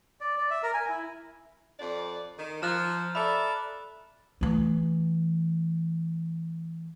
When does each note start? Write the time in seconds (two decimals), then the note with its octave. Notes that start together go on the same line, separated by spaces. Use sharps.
0.21 D5
0.37 D5
0.50 E5
0.63 A#4
0.74 G#5
0.89 E4
1.79 F2 D5
2.37 D#3
2.62 F3 A#5 F6 F#6
3.15 A4 D5 E5 B5
4.41 E3 A3